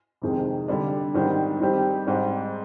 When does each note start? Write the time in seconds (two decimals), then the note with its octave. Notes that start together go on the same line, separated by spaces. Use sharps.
0.22 F2 C3 D#3 G#3
0.68 D3 G3 D4
1.14 G#2 D#3 G3 C4
1.60 D#3 G3 C4 G4
2.07 G#2 G3 C4